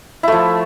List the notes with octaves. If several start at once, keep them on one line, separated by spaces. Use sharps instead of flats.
F3 A3 E4